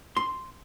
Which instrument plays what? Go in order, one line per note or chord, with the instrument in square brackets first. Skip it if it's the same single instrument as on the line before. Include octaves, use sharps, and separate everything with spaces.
[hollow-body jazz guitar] C6